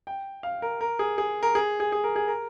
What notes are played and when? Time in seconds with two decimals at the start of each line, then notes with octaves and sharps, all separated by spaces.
0.07 G5
0.43 F5
0.62 A#4
0.81 A#4
0.99 G#4
1.18 G#4
1.43 A#4
1.55 G#4
1.80 G#4
1.92 G#4
2.04 A#4
2.16 G#4
2.28 A#4